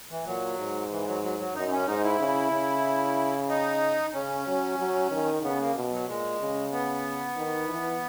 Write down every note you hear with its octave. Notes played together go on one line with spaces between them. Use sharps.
E3
A#2 F#3
G#2
E3
F#3
F#3
F#3
F#2 D#4
C#4
G#2 D#4
E4
C#3
C#3
D#4
C#3 C#4
F#3
F#3
D#3
C#3 B3
A#3
B2
F#3
A#2 G#3
C#3
B3
D#3
E3